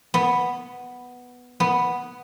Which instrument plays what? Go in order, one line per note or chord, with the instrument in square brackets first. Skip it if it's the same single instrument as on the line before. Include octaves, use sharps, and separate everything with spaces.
[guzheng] B3
B3